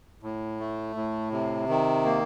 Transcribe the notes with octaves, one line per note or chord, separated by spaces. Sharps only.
A2
A3
A2
C3
D#3
A#3